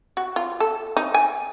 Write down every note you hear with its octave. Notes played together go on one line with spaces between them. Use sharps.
F#4
F4
A4
D#4
G#5